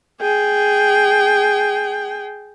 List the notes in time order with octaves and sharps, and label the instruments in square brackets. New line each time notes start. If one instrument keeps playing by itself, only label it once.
[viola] G#4 G5